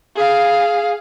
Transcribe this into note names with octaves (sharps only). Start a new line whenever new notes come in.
G#4 F5